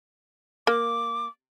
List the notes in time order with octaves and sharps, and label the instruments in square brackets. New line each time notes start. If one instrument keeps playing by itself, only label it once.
[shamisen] A#3 [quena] D6